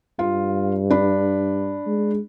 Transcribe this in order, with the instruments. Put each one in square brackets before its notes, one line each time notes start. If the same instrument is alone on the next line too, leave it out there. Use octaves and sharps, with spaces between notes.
[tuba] G2 [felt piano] F4
[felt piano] D4 B5
[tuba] G#3